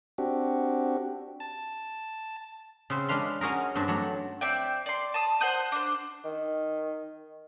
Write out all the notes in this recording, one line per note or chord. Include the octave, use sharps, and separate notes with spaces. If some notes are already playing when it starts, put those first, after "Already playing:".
C4 D4 F#4 G4
A5
C#3 C4 B4 C5
G#3 D4 B4 F5 C6
C#4 F#4 G#4 A#4
G2 C4 D4
F#3 A3
C4 D5 E5 G5
D5 C6
A5 D#6
C5 F#5 D#6
D4 C5
D#3